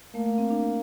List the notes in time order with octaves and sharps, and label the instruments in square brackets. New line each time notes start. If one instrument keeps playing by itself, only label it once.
[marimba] A3 [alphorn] A#3
[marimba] A3
C4
D4